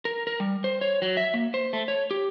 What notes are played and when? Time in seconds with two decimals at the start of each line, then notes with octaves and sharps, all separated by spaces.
0.05 A#4
0.27 A#4
0.40 G3
0.64 C5
0.81 C#5
1.02 F#3
1.17 E5
1.34 A#3
1.54 C5
1.73 A3
1.88 C#5
2.11 G4